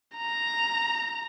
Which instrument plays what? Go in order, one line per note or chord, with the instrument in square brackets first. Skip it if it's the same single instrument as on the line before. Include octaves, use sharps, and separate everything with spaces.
[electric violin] A#5